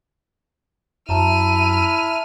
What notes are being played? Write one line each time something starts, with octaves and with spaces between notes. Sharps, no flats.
F#2 E4 A5 A#5 F6 D#7 E7